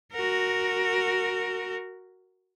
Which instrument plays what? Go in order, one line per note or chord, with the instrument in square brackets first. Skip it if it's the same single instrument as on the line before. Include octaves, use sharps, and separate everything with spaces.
[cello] F#4 A#4